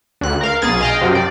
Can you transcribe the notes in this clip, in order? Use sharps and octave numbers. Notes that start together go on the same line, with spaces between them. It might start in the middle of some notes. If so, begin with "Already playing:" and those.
D2 F#6
A#4 F5
B1 G#4 A6
D#5 F5 G5
F#2 C3
D5